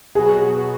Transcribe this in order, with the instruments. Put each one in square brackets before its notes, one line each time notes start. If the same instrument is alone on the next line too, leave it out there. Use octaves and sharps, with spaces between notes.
[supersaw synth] B2 F#3 B3 F#4 [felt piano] G#4